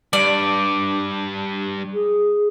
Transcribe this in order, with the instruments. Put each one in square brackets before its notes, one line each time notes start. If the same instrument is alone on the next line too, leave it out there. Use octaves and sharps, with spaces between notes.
[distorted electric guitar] G2 [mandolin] D5
[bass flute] G#4